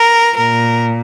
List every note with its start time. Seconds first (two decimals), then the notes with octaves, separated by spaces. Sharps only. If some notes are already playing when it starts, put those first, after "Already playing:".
Already playing: A#4
0.36 A#2 A#4